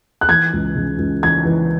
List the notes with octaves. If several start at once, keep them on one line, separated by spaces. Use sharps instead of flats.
F#6
E3 G#6
C#2
C#3
C#2
E3 G#6
E3